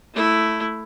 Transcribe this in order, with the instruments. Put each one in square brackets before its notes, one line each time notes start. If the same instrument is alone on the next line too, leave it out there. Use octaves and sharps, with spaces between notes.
[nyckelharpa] A3 E4